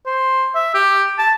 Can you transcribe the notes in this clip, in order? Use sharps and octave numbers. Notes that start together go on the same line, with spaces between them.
C5
E5
G4
A5